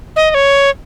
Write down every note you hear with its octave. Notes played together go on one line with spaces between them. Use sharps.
D#5
D#5
C#5